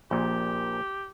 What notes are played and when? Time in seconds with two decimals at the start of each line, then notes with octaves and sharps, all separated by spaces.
0.11 A#1 A#2 G4